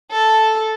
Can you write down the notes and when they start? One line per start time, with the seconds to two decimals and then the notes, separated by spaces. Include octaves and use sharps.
0.11 A4